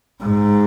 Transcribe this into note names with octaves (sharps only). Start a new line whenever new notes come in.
G#2